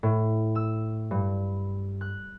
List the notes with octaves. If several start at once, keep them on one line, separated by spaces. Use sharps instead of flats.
A2
E6
G2
F#6